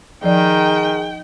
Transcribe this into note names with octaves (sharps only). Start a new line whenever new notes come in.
D#3 F3 G#4 D5 G5